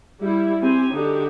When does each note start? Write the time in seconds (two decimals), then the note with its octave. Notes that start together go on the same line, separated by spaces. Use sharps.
0.20 G3 E4
0.62 C4 G4 G#5
0.93 D3 D#4 F#4 G4